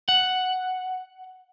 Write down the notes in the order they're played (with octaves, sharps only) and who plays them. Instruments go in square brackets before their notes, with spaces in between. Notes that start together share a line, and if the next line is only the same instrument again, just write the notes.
[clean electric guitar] F#5